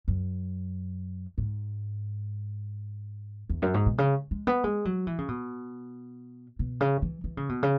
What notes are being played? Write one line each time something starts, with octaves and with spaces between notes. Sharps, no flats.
F#2
G#2
E2
F#2
G#2
B2
C#3
G#3
B3
G#3
F#3
E3
C#3
B2
B2
C#3
E3
E3
C#3
B2
C#3